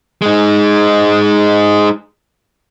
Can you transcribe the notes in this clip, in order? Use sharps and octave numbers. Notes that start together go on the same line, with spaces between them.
G#3 D#4